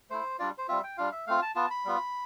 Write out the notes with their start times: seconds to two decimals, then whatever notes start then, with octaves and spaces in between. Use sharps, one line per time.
0.10 A3 E4 C5
0.39 G3 D4 F4 D5
0.58 C5
0.68 G3 C4 F4 E5
0.84 G5
0.97 G3 D4 F4 F5
1.12 E5
1.27 A3 C4 F4 F5
1.42 A5
1.56 B3 F4 A5
1.70 B5
1.85 G3 B3 F4